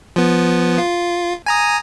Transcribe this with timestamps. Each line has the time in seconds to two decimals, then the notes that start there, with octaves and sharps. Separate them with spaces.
0.16 F3 B3
0.78 F4
1.46 G#5 A#5 D#6